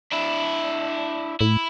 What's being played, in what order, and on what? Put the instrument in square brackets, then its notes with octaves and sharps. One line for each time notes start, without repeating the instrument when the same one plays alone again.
[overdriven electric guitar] D4 E4
[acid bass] A2 [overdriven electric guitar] E4